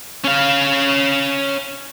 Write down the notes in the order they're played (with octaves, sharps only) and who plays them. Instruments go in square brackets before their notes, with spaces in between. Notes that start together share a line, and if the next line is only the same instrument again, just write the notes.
[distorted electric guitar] C#4 F5